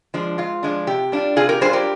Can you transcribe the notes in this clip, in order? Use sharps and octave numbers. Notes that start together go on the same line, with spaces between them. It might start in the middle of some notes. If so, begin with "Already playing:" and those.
F3 G#3 D4
G#2 F4
F3 G#3 D4
C3 G4
G3 D4 F4
C3 F4 G#4
G4 A#4
G3 D4 F4 G#4 C5
G4 A#4